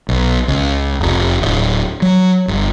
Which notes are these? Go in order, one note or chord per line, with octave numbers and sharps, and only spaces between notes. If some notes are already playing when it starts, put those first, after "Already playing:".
B1
C#2
F1
D1
F#3
G1